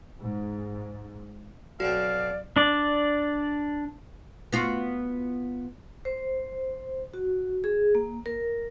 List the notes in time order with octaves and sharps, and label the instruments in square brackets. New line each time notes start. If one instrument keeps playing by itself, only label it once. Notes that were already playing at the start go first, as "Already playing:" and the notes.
[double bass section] G#2
[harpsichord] B1 B2 C4 [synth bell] F#4 [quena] D5 [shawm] F5
[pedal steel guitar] D4 D5
[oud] B3 F4 F#4
[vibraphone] C5
F#4
G#4
A#3
A#4